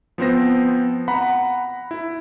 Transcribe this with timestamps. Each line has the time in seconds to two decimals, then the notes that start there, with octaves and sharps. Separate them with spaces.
0.18 F3 B3 C4 C5 A#6
1.08 F#5 A#5 B5
1.91 E4